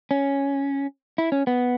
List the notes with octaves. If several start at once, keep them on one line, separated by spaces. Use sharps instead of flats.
C#4
E4
C#4
B3